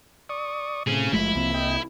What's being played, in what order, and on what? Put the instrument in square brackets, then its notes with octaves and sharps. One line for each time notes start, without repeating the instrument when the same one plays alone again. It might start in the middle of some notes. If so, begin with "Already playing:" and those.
[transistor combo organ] D5 C#6 D#6
[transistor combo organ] A2 C3 [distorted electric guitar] C#4 G#4
[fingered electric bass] F#1 G#3 A3 [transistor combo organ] F3 [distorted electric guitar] E4
[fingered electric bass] C2 A#3 C4
[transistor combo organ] D#5 G5